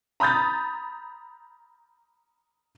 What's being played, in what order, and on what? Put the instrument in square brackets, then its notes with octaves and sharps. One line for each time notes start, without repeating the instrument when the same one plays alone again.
[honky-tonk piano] A#5 B5 D#6 G6 A6